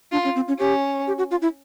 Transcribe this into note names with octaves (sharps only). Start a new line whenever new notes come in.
D4 F4
C#4
C4
C#4
C#4 G4
G4
F#4
F4
E4